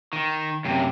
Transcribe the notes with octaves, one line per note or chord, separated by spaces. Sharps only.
D#3
F#2 C3